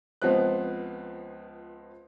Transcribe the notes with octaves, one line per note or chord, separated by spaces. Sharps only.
C#2 F3 B3 C4 F#6